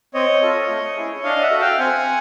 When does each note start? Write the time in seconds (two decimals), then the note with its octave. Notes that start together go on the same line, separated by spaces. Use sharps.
0.14 C4 C#5 D#5
0.42 F4 A4
0.69 A3
0.97 C#4 E4 G#4
1.24 D4 D#5 F5
1.42 E5 F#5
1.51 F#4 A4
1.60 F5 G5
1.78 C4 F#5 G#5